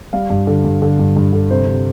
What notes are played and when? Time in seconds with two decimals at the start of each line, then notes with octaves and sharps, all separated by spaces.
0.13 G3 F5
0.30 G2
0.47 D3
0.64 G2
0.82 D3
0.99 G2
1.17 G2
1.33 D3
1.51 C3 C5
1.67 C3